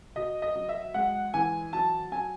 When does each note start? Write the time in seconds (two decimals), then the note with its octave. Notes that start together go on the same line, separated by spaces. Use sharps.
0.16 B2 D#5
0.42 D#5
0.55 F#3
0.69 E5
0.94 G#3 F#5
1.34 E3 G#5
1.73 F#3 A5
2.12 F#3 G#5